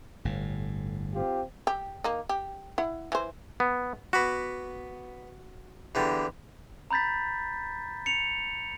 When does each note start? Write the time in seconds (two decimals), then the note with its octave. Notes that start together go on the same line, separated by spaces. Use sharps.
0.25 G1 A2
1.13 C4 F4 G4
1.67 G4
2.04 A#3 D#4
2.29 G4
2.78 E4 F#5
3.12 E3 C5
3.60 B3
4.13 B3 F#4 B5 D6
5.95 E2 D3 G3
6.91 A#5 B5 G6 A6 B6
8.06 C#7 F7